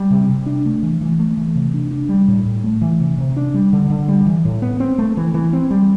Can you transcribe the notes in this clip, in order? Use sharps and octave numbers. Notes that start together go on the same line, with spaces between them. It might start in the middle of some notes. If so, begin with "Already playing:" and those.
Already playing: G3
C3
C3
D4
A3
E3
E3
A3
E3
C3
D4
D4
G3
A2
A2
A3
E3
C3
C3
D4
G3
D3
D3
G3
E3
A2
B3
C4
A3
E3
E3
C4
G3